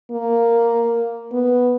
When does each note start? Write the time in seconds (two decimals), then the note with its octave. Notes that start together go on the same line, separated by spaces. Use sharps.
0.11 A#3
1.32 B3